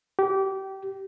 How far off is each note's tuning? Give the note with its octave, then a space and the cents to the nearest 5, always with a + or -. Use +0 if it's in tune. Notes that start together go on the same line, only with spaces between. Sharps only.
G4 -25